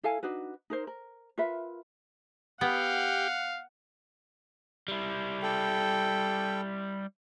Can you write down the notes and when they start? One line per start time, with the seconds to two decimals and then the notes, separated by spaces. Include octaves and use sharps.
0.03 E4 A4 F5 G#5
0.23 D4 D#4 F#4 B4
0.70 D#4 A#4 C5
0.87 A#4
1.38 F4 A#4 B4 E5
2.61 B3 G4 F5 F#5
4.88 G3 E4
5.43 A4 G5